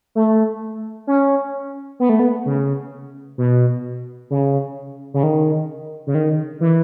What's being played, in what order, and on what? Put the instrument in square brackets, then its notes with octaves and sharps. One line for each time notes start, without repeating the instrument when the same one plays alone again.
[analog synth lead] A3
C#4
B3
A3
B3
C#3
B2
C#3
C#3
D#3
C#3
D#3
E3